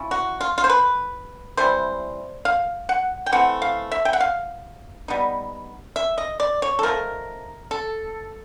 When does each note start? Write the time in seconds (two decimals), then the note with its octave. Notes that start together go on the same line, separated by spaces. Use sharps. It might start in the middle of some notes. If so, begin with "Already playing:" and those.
Already playing: F3 C#4 E4
0.11 F#4
0.41 F4
0.58 F4
0.64 C5
0.70 B4
1.57 C3 E3 G3 C5
2.45 F5
2.89 F#5
3.26 G5
3.32 E3 A3 C4 F#5
3.62 F5
3.92 E5
4.05 G5
4.13 F#5
4.20 F5
5.08 G3 B3 D#4
5.96 E5
6.18 D#5
6.40 D5
6.62 C#5
6.79 A4
6.83 F3 A3 C4 D#4 A#4
7.71 A4